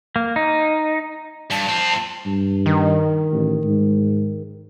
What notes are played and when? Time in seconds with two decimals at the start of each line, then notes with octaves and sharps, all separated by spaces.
0.16 A#3
0.36 D#4
1.51 G2 A5
1.69 C4 F4
2.26 G2
2.66 D#3
3.32 A1
3.64 G#2